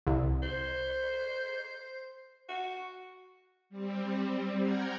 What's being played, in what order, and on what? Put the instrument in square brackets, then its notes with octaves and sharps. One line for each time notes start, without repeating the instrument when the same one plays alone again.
[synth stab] C2
[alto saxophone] C5
F#4
[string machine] G3 C4
F#5 G5 A#5 F6 G6 G#6